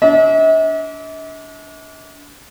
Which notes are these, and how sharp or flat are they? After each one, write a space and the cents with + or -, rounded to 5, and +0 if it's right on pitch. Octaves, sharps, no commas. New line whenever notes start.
D4 -30 E5 -45